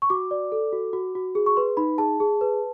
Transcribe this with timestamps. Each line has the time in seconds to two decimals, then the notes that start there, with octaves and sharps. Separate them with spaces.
0.02 C#6
0.10 F#4 D6
0.31 D5
0.52 A4
0.73 F#4
0.93 F#4
1.15 F#4
1.35 G#4
1.46 C#6
1.57 B4 C6
1.77 D#4 B5
1.98 G#4 A5
2.20 G#4
2.41 B4